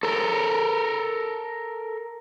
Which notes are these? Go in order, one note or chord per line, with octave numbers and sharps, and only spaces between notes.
A4 A#4